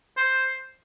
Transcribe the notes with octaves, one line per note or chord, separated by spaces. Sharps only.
C5